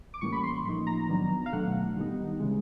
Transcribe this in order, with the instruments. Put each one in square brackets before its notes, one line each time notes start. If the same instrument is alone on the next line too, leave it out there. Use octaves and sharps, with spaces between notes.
[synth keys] D6
A2 E3 G3 A#3 C#4 C#6
B5
C6
A2 F3 A#3 D#4
A#5
D#3 F#3 B3 D4
F5
B2 F#3 A3 D4 F#5
D#3 G3 B3 D#4
C#3 E3 G#3